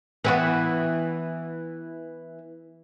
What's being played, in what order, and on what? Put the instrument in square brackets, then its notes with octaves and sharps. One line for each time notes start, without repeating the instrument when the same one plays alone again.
[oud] E3 B3 F#4